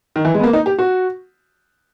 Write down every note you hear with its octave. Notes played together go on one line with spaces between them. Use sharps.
D#3
E3
G#3
B3
A#3
D#4
G4
F#4